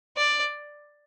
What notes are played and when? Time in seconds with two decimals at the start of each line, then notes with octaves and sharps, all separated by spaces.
0.17 D5